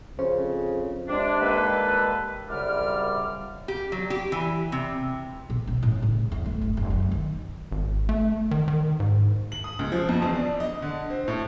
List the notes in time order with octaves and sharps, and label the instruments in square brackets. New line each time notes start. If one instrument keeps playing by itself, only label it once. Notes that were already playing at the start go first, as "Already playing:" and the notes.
[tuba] F2 [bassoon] C#3 [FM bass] C#4 [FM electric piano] C5
[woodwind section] C3 G#3 D4
D#3 G3 G#3 A#3 A4 B4
C2 F#2 C#3 G3 D5 F6
[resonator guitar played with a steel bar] G4
F#3
G4
E3
C3
[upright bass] B2
C#4
A2
C#3
E2
A3
G1
F1
F#2
D#3
[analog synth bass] G#1
A3
D#3
D#3
G#2
[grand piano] F#7
D#6
C#2
F3
F2
E2
D4
D#5
D3
C4
A2